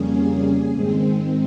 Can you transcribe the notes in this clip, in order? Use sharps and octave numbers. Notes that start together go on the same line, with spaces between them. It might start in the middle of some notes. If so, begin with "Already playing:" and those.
Already playing: F2 C#3 G3 A#3 C#4 G#4
G#2 D#3 G#3 C4